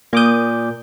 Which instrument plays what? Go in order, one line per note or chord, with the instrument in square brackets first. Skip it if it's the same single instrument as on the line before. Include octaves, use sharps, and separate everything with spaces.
[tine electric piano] A#2 D6 G6 [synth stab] A#3 D#6